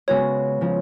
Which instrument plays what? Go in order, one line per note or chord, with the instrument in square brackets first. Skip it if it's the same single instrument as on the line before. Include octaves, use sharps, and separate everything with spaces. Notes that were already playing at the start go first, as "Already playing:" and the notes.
[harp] C#3 G#3 B3 F#4 [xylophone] C#5
[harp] C#3 F3